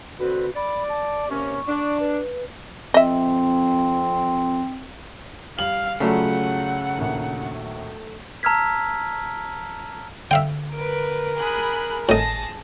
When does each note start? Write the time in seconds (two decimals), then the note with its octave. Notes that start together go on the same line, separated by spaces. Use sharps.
0.20 D3 C4 F#4 B4
0.56 D5 B5
0.89 A5
1.30 C3 A#3 C#4 C#6
1.68 D4
2.00 B4
2.94 F2 C4 D#5 E5
5.59 G3 F5 F#7
6.00 C#3 F#3 A3 F4 C#5 D5 F#5
6.97 A#1 D#2
8.43 A5 A#5 E6 F6 G#6 B6
10.31 D3 E5 F5 G5
10.74 A#4 B4 D7
11.37 G#4 B5 F#6
12.09 G#1 A2 G#4 D#5 A5 A#6